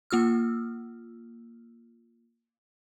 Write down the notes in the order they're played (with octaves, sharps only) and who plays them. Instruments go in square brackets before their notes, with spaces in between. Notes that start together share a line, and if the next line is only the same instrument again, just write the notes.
[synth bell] A#3 F4 E6 F6